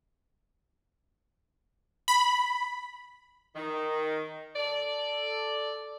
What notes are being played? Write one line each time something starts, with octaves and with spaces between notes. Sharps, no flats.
B5
D#3
A4 D5